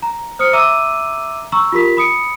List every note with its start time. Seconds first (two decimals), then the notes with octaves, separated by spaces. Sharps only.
0.02 A#5
0.39 C5 D#6 F6 C#7
0.53 E5 A#5 D6 E6 D#7
1.52 A#5 C#6 E6
1.72 F4 G4 A#4 B6
1.97 B5 D#6 C#7 D7